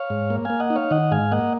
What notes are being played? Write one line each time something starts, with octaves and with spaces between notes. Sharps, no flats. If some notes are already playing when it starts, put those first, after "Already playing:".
Already playing: C#5 F5
G#2
A#3
A#3 F5 G#5
D#5 F#5
D#4
C#5 F5
D#3 D#5 F#5
G#2 F5 G#5
A#3 D#5 F#5